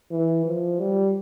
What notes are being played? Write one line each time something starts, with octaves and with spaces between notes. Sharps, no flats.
E3
F3
G3